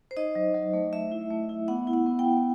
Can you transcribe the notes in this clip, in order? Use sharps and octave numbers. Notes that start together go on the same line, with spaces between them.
C5
D#4 D#5
F#3
F#3
A3
A3 E5
E4
A3
E4
B3 F#5
E4
F#5
B3
G5
E4